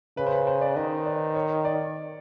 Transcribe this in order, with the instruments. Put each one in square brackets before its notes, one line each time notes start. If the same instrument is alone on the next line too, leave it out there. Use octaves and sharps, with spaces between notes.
[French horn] C#3 [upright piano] B4
[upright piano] C5
B4
C5
D5
[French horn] D#3 [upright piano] D#5
[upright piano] D5
C#5
D5